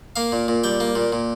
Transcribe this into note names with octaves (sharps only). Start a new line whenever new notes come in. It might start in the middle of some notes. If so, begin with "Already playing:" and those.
A#3 F5
A#2
A#2
G3 G5
A#3
A#2
A#2